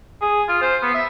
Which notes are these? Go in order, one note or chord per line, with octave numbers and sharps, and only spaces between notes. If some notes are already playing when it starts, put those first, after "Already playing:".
G#4
F4
C5
B3
E5